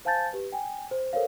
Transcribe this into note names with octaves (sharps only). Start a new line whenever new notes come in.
C5 F5 G#5 A5 G6 A6
G4 B4
G5 G#5
C5
A4 A#4 C5 C#5 F5